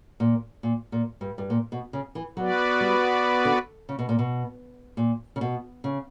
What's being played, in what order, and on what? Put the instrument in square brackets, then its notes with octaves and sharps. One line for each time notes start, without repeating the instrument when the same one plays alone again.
[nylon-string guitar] A#2
A#2
A#2
G2
G2
A#2
B2
C#3
E3
[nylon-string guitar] F#3 [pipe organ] B3 F#4 B4 D5
[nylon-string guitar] G3
D3
C#3
B2
A#2
B2
A#2
C#3
B2
C#3